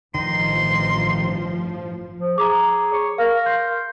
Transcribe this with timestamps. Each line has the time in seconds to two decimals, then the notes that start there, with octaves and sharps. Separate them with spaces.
0.15 A1 G2 D#3 F3 D#4 C6
2.18 F3
2.38 G#4 A#5 D6
2.93 C#5
3.18 A#4 F5
3.46 C6 G6